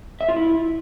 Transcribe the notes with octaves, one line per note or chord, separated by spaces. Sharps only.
E5
F4
E4